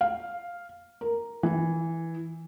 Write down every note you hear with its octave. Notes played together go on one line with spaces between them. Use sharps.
F5
A#4
E3